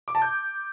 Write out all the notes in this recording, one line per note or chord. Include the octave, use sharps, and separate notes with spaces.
D6
A5
G6